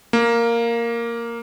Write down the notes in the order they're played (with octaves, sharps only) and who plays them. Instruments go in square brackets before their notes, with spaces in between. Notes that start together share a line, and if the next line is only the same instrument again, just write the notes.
[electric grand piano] A#3